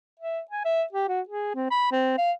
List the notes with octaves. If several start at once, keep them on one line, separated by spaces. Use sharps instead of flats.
E5
G#5
E5
G4
F#4
G#4
C4
B5
C4
F5